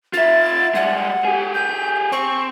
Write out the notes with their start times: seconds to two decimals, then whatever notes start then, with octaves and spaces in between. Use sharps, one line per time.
0.13 F4 E5 A6
0.75 G3 G#3 F#5
1.25 G4 G#4
1.54 G6
2.12 C4 C#6